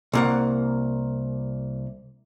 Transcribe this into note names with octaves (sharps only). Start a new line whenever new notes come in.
C2 A#3 F#5